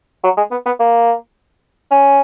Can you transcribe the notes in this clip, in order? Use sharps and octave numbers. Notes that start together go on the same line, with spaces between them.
F#3
G#3
B3
B3
A#3
C#4